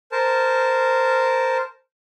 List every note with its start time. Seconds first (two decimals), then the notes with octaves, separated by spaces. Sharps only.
0.12 A#4 C5 A5